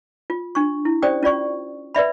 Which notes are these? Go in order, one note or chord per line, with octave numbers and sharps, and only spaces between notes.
F4
D4 C#6
E4
C#4 G4 C5 D5 G5 D#6
C#4 F4 D5 C#6
B4 D5 E5 B5